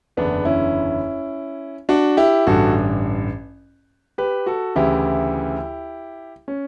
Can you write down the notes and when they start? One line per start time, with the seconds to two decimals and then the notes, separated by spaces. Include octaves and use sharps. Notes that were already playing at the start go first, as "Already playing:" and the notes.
0.17 F#1 E2 D3 B3 D4
0.45 C#4 E4
1.89 D4 F#4
2.17 E4 G4
2.47 A1 G2 D3 F#4 A4
4.18 G4 B4
4.46 F#4 A4
4.76 D2 C#3 E3 E4 G4
6.48 C#4